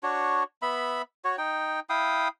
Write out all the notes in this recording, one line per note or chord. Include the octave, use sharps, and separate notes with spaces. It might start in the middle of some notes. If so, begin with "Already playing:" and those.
D4 F#4 C#5
B3 E5 B5
F#4 C#5
D#4 G5
E4 F5 G5 D#6